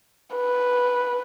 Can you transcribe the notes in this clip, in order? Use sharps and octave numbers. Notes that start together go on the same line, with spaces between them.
B4